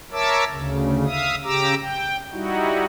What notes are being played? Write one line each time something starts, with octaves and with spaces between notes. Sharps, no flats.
A#4 C#5 E5 A5 D6 E6
D2 C#3
E5 F5 D#6
C#3 G4 A#5 D6 E6
G5
G3 D#4 E4 F#4